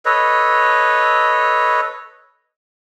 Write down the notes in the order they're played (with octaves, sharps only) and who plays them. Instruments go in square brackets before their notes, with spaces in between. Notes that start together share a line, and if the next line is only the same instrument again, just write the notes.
[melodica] A4 B4 C#5 D#5